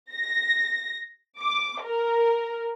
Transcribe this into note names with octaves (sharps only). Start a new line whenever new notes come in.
A#6
D6
A#4